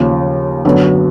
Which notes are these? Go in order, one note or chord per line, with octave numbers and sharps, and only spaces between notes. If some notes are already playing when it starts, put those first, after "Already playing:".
Already playing: D#2 C#3 F3
F#2 D3 F#3 B3